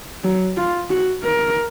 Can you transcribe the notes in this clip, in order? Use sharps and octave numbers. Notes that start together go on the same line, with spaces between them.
F#3
F4
F#4
A#4